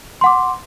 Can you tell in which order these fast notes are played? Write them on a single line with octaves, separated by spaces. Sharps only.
C6 F#5 D6